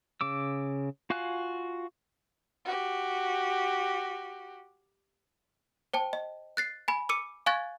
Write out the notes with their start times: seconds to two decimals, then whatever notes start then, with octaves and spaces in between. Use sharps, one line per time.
0.21 C#3 D6 E6
1.10 F4 F#4 F5 G#5 F#6
2.65 F#4 G4
5.94 C5 G5 A5
6.13 D#5
6.57 F#6 A6 C7
6.88 G#5 B5
7.09 D6 E6 C#7 D#7
7.46 F5 G#5 C#6 F#6 G#6 A6